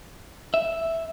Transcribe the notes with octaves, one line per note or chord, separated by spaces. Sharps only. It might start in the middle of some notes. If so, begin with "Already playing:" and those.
E5